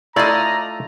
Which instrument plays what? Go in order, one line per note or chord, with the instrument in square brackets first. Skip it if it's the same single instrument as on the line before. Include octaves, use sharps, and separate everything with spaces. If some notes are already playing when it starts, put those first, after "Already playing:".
[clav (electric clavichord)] A3 E4 F4 [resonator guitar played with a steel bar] D5 D#5 [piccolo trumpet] A#5